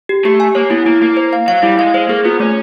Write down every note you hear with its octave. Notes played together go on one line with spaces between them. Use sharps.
G4
A3 G4
G#5
A#3 C#5
B3 E4
A#3 E4
A#3 E4
C5
F5
F#3 F5
G3 E4
G#3 F5
G#3 C5
A#3 G#4
B3 F4
A3 C#4